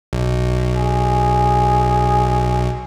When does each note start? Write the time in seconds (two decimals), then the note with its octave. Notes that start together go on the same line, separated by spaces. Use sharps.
0.13 B1
0.74 G#4